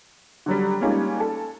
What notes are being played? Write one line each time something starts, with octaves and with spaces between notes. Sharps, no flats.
D3 F#3 G3
G3 G#3 A#3 C#4 D#4 F4
A4